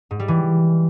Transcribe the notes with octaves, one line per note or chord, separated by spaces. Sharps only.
G#2
G3
E3